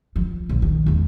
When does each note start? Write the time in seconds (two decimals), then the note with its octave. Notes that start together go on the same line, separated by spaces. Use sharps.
0.16 F3
0.49 A#1
0.62 D#3
0.86 E2 G#3